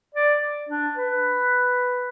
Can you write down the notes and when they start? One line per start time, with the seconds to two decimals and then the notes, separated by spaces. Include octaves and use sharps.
0.15 D5
0.69 D4
0.97 B4